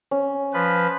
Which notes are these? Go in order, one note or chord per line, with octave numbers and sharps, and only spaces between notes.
C#4
F3 B4